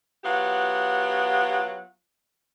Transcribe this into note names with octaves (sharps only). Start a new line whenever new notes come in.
F#3 B3 F4 G4 F#5